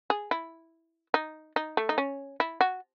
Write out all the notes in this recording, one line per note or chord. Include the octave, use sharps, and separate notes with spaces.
G#4
E4
D#4
D#4
A3
D#4
C#4
E4
F#4